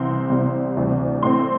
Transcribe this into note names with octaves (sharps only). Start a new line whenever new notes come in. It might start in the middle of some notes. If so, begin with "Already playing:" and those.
Already playing: C2 C3 E3 C4 C6
C2 C3 G3 C4
D2 C3 E3 G3
A2 A3 C4 C6